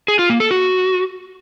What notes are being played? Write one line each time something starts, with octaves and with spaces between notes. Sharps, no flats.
G#4
F4
A#3
A4
F#4